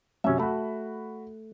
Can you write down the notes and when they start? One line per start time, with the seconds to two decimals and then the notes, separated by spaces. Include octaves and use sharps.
0.24 F#2 C3 C#4 E5
0.40 A3 F#4 B5